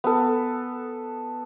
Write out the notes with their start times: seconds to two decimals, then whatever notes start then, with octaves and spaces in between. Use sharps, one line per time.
0.04 B3 A4